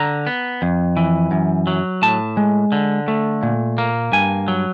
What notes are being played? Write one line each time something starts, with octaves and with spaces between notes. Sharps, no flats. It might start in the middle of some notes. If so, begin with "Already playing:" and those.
Already playing: D3 A#5
B3
F2
E3
F#2
F#3
A2 A5
G#3
D3
A3
A#2
A#3
G2 G#5
F#3